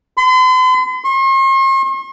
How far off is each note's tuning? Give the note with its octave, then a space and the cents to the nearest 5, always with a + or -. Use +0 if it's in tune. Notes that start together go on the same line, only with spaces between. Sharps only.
C6 -45
C6 +45